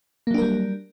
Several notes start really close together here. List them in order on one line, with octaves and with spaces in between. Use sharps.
A#3 F#3 D4 A#4 G3